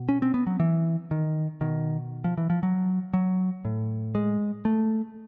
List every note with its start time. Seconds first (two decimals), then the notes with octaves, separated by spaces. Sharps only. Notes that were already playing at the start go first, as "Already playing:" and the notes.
Already playing: B2
0.09 C#4
0.22 C4
0.34 B3
0.47 F#3
0.60 E3
1.11 D#3
1.61 B2 D#3
2.24 F3
2.37 E3
2.50 F3
2.63 F#3
3.14 F#3
3.65 A2
4.15 G#3
4.65 A3